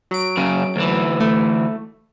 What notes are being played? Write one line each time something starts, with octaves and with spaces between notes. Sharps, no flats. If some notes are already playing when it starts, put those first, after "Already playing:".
F#3 D7
F#2 C#3
D2 E3
A3